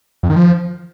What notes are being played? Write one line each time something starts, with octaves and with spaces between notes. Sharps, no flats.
F2
D#3
F3